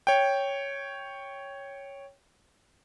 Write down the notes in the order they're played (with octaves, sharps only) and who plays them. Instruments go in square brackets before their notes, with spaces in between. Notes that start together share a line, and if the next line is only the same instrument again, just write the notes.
[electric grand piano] C#5 G5